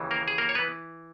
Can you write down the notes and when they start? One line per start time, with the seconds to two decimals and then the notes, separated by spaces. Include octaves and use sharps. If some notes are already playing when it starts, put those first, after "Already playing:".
Already playing: D#2 C#3 E3
0.11 A#3 A#4
0.28 G#4
0.38 A#3 A#4
0.49 C#5
0.55 E3 B3 B4